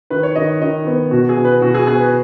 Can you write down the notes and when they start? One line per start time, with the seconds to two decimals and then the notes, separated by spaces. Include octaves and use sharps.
0.10 D#3 B4
0.23 C#5
0.36 D#3 D#5
0.61 D#3 D#5
0.87 B3
1.11 B2 F#4
1.29 G#4
1.37 B2
1.45 B4
1.62 B2 F#4
1.74 G#4
1.87 B3 G#4
2.00 B4